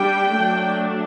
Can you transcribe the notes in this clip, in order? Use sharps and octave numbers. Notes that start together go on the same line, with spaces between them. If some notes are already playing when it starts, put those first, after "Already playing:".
Already playing: G3 D4 G5
F#3 A3 D4